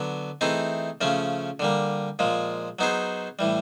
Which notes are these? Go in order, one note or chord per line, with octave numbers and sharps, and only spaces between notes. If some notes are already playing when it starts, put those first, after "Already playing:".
Already playing: D3 F#3 B3
E3 A3 C4 D#4 G#4
C#3 F3 A3 C#4
D3 G3 A#3
A#2 F3 G#3
F#3 B3 D#4 G#4 C5
A2 E3 G3